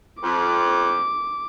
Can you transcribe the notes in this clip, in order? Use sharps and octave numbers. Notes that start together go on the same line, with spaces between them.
F2 D6